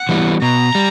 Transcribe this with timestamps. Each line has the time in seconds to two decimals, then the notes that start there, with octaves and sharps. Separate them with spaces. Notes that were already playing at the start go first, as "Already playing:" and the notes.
Already playing: F#5
0.09 E3 G3 B3
0.42 B2 A#5
0.75 G3